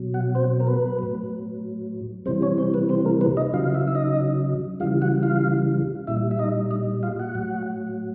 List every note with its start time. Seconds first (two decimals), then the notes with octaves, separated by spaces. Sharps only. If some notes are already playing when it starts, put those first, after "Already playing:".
Already playing: B2 F#3
0.14 F#4 F#5
0.35 C4 C5
0.60 A#4
0.67 B3 B4
0.99 A2 F#3
2.26 C3 E3 G3 C4 C5
2.42 C#4 C#5
2.58 C4 C5
2.74 B3 B4
2.89 C4 C5
3.05 A#3 A#4
3.21 B3 B4
3.37 D#4 D#5
3.53 C#3 F#3 F4 F5
3.64 F5
3.74 E4 E5
3.87 E5
3.95 D#4 D#5
4.80 C#3 E3 G3 F4 F5
5.02 F#4 F#5
5.22 F4 F5
6.07 A#2 G3 E4 E5
6.31 E5
6.39 D#4 D#5
6.71 D#4 D#5
7.03 F4 F5
7.19 F#4 F#5
7.35 A2 F#3